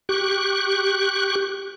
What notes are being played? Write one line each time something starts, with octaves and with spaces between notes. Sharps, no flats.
G4 C#6 F#6